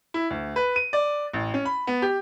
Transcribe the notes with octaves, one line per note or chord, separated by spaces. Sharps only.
E4
D2
B4
D#7
D5
A1
C#4
B5
B3
G4